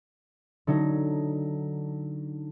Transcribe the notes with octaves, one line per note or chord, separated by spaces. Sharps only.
D3 F#3 D#4